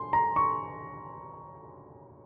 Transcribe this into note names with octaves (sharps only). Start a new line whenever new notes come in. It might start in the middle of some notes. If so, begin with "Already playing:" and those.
Already playing: C6
A#5
C#6